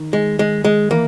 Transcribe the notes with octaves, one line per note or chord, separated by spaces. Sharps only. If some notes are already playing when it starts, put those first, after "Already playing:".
Already playing: D#3
G#3
G#3
G#3
E3 A#3